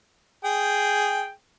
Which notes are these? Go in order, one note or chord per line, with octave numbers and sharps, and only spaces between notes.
G#4 G5